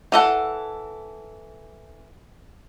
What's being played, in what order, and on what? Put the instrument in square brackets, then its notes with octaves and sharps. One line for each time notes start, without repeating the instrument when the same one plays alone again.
[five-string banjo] E3 A4 F#5